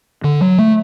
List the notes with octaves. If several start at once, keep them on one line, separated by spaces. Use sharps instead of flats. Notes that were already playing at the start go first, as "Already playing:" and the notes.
D3
F#3
A3